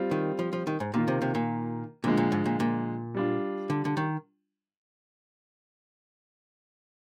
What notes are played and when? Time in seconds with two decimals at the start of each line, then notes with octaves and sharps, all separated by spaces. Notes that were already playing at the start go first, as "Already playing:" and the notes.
Already playing: G3 C4 F4
0.11 D#3
0.39 F3
0.53 F3
0.67 D#3
0.80 G#2
0.94 A#2 D#3 A#3 F4
1.08 C3
1.22 C3
1.35 A#2
2.04 A#2 D3 F3 G#3
2.17 A#2
2.32 G#2
2.46 A#2
2.60 A#2
3.14 G3 D4 F4
3.70 D3
3.85 D3
3.97 D#3